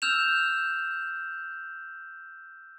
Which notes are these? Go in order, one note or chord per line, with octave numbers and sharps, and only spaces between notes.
E6 F6 G6 E7 F7